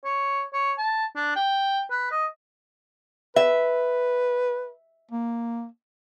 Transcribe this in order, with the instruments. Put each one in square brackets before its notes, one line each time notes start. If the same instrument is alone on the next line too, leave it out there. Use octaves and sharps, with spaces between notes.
[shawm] C#5
C#5
A5
D4
G5
B4
D#5
[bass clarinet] B4 [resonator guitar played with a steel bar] E5
[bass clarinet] A#3